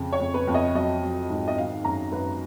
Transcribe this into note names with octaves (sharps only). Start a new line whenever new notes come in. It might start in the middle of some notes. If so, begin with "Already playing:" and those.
Already playing: F2 C#3
C#5
F2
B4
F2
D#5
F#3 D#5
F#3
G#2
D#5
D#3 F5
F#2 A#5
F#2 B4